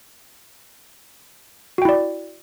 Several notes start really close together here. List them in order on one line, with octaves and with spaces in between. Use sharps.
F#4 G5 E4 D5